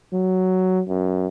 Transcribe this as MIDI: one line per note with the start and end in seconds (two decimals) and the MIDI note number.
0.14 0.82 54
0.89 1.27 42